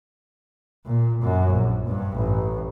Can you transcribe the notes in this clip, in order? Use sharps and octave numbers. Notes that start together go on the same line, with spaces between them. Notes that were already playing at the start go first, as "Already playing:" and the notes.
A#2
F#2
A#1
G2
A1